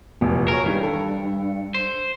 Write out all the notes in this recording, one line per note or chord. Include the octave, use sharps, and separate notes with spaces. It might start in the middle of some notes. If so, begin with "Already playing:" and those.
F1 A#1 E2
F#4 G#4 A#4 C#5
G2 D#3 E3 G3
A4
C5